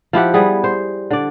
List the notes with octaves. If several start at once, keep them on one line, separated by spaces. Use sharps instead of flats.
F3 E4 G4 F#5
G3 B3 G#4
C5
D3 D5